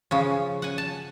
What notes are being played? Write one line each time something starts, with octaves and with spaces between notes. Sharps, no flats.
C#3 F3 C#4
F#5 G#5
A5